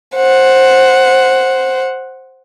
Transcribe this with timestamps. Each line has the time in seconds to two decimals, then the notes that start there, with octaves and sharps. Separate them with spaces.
0.15 C5 F#5